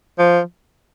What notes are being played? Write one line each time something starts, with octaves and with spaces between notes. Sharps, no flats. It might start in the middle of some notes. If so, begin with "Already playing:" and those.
F3